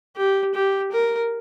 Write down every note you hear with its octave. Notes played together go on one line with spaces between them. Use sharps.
G4
G4
A#4